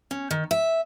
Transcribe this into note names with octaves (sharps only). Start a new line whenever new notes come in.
C#4
D#3
E5